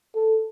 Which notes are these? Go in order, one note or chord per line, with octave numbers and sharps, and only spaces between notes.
A4